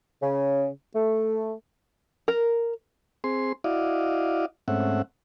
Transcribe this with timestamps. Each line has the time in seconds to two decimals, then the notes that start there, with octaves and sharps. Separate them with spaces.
0.21 C#3
0.95 A3
2.28 A#4
3.24 C4 G#4 C6
3.64 E4 F#4 D5 D#5 F5
4.68 G#2 A3 C4 C#4 E5 F#5